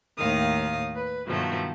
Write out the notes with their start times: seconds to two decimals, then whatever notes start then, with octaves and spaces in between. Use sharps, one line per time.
0.18 D#2 A2 D#3 F5 D#6
0.95 B4
1.26 G2 B2 D#3 F3 F#3 A3